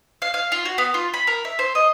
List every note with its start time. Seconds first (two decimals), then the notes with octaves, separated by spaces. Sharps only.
0.22 F5
0.34 F5
0.52 F4
0.65 F#4
0.78 B3
0.94 F4
1.14 B5
1.27 A#4
1.45 E5
1.59 C5
1.75 D#5